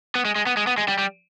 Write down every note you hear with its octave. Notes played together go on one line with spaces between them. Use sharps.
B3
G#3
G#3
B3
G#3
B3
G#3
G3
G3